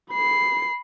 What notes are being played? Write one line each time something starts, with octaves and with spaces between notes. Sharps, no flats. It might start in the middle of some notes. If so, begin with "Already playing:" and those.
B5 C7